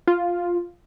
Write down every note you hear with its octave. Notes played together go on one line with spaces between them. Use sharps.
F4